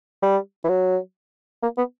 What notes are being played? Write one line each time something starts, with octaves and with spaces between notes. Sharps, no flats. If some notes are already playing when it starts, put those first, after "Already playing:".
G3
E3
F#3
A#3
B3